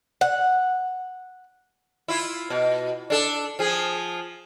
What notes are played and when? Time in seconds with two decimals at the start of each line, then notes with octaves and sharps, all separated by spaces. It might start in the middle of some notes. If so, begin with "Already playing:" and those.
0.21 F#5
2.08 E4 F4
2.50 B2
3.10 D4 A4
3.59 F3 G#4